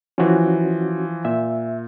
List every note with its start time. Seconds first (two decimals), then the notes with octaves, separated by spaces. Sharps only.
0.18 E3 F3 C#4 F#4
1.25 A#2 E5